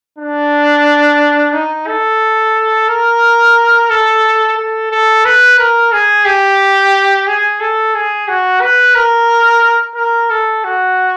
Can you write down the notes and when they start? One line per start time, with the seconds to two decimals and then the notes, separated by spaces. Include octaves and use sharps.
0.19 D4
1.53 D#4
1.87 A4
2.88 A#4
3.90 A4
4.58 A4
4.91 A4
5.25 B4
5.59 A#4
5.93 G#4
6.26 G4
7.28 G#4
7.60 A4
7.95 G#4
8.28 F#4
8.61 B4
8.95 A#4
9.96 A#4
10.30 A4
10.64 F#4